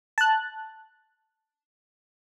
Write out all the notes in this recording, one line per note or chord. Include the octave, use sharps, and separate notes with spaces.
A5 F#6